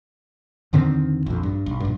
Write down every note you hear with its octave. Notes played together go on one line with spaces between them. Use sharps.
E2 D3 D#3 C4
A#1 F2
G2
B1
A#1 G2